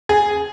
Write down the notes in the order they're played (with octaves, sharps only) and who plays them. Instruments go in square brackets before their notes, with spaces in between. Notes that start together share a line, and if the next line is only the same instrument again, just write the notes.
[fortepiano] G#4